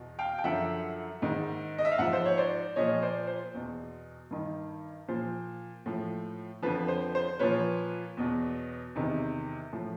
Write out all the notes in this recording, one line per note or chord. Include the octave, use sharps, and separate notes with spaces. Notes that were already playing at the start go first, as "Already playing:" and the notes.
Already playing: E2 B2
F5 G5
G5
F#2 D3 F3 E5 F#5
G#2 D#3
D#5
E5
F5
G#2 F3 E5 F#5
C5
C#5
C5 D5
A#2 F3 C#5 D#5
C5 D5
C5
E2 B2
G2 D#3
A#2 F3 C5
A2 F3
F2 D3 F3 B4
C5
C5
A#2 F3 B4 C#5
E2 B2
E2 C3 D#3
A2 F3